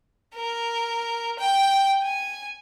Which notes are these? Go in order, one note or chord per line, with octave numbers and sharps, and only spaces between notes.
A#4
G5
G#5